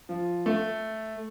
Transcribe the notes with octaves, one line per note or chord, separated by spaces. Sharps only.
F3
A3